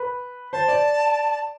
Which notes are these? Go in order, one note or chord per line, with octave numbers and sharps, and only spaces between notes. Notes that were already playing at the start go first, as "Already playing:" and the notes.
Already playing: B4
C5 A5
D5